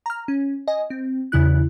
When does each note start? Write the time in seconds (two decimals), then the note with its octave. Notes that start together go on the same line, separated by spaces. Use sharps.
0.06 A#5 F6
0.28 C#4
0.68 D#5 G#5
0.90 C4
1.32 E2 C#3 E4 F#6